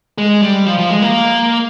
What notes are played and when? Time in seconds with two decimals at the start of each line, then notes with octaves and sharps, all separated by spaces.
0.18 G#3
0.42 G3
0.66 F3
0.78 F3
0.90 G#3
1.02 A#3